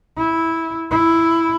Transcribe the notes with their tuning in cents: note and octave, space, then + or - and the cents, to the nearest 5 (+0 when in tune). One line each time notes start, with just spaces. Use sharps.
E4 -10
E4 +5